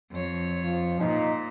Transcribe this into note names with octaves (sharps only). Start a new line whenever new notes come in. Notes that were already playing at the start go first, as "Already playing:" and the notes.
F2 C#5
F3
A#2 D#4